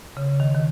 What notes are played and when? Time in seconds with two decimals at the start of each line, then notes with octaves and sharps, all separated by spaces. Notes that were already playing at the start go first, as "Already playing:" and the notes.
0.17 C#3
0.40 D#3
0.55 D#3